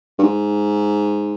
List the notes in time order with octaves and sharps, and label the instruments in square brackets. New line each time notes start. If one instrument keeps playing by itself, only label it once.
[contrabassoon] G2
G#2